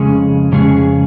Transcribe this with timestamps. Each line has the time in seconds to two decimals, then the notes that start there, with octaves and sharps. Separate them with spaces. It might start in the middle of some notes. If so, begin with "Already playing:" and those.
Already playing: F2 C#3 G#3 C#4 G#4
0.52 F2 C#3 G#3 C#4 G#4